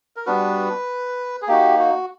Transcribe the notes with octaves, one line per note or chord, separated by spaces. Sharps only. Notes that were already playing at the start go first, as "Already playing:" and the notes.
A#4
G3 B3 D4 F#4 B4
G#4
A#3 D#4 F#4 G4
F#4